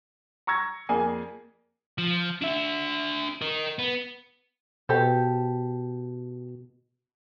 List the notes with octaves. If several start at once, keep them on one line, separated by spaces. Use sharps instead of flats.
A#5 C#6 E6 G#6 A#6
F2 A#3 G#4 D5 G#5
F3
D4 E5
A#4 D#5
B3
B2 G4 A4 C5